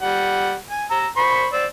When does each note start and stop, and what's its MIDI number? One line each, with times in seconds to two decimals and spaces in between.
0.01 0.54 55
0.01 0.54 78
0.70 0.85 80
0.91 1.07 82
0.91 1.07 88
1.17 1.47 72
1.17 1.47 83
1.17 1.47 85
1.53 1.65 72
1.53 1.65 74
1.53 1.65 88